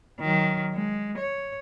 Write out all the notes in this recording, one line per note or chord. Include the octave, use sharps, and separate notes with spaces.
D#3 F#3
G#3
C#5